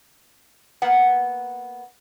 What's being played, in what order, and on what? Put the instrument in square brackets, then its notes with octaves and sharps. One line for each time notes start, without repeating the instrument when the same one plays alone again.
[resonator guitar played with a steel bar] A#3 B3 F#5